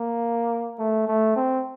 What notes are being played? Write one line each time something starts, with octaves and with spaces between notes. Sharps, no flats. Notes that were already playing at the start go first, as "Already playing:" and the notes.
Already playing: A#3
A3
A3
C4